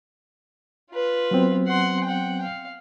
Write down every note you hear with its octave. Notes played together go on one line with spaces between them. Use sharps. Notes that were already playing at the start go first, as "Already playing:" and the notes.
F4 B4
F#3 B3 C4
F#5 C6
F#5 G5
F5